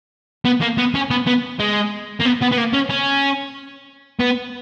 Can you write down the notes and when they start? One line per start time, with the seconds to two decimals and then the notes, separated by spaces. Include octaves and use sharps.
0.45 B3
0.62 A#3
0.78 B3
0.95 C#4
1.11 B3
1.27 B3
1.59 G#3
2.20 A#3
2.25 B3
2.41 B3
2.52 B3
2.58 A#3
2.73 C#4
2.89 C#4
4.20 B3